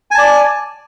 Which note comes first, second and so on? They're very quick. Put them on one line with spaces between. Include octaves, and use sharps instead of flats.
G#5 A5 D5